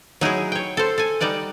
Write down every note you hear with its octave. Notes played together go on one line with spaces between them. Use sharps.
F#3 D#4 E4 G#4
C#5 G5
A4 C5
A4 G#5
G3 D#4 D5 F#5